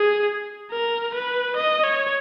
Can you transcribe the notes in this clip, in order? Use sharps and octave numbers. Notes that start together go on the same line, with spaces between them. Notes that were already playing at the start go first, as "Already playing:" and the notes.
Already playing: G#4
A#4
B4
D#5
C#5